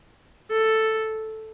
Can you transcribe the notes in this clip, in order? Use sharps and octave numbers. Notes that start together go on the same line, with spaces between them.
A4